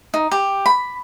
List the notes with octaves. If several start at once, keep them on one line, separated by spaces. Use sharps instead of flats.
D#4
G4
B5